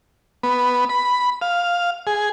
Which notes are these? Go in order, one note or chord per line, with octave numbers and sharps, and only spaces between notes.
B3
B5
F5
G#4